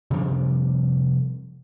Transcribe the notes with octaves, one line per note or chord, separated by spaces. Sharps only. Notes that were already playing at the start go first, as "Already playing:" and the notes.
C3 F3 G3 D4